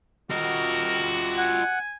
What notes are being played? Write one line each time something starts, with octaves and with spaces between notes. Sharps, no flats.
C3 G3 F4 F#4 A#4 D#5
F#5 G#5